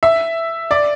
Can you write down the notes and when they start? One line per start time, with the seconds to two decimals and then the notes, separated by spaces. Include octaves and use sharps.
0.03 E5
0.71 D5